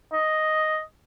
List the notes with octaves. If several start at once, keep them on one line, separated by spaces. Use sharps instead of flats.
D#5